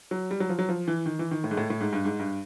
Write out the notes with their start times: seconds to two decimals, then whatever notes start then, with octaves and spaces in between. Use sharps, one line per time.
0.11 F#3
0.31 G3
0.40 F#3
0.49 F3
0.59 F#3
0.69 F3
0.88 E3
1.06 D#3
1.19 E3
1.31 D#3
1.44 A2
1.51 G#2
1.57 A2
1.70 A2
1.81 G#2
1.93 G2
2.05 G#2
2.20 G2